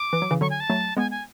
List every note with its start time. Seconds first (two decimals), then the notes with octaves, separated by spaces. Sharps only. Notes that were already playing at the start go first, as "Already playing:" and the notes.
Already playing: D6
0.13 E3
0.22 F#3
0.31 C#3 E3
0.41 D3 F#3 C#6
0.50 G#5
0.60 A5
0.70 F#3 A3
0.97 G#3 B3 G#5
1.11 G#5